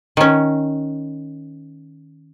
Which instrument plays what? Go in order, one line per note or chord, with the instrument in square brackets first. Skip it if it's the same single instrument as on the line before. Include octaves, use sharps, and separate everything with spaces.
[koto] D#3 C#4